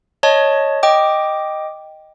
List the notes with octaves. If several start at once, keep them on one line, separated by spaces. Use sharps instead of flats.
C#5 D#5 A5
D#5 G5 D6